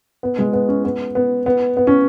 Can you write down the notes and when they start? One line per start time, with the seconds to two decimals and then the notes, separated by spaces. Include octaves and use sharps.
0.23 B3
0.39 G#3
0.53 B3
0.68 C#4
0.84 B3
1.15 B3
1.46 B3
1.77 B3
1.87 C#4